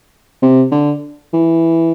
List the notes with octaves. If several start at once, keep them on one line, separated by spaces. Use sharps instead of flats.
C3
D3
E3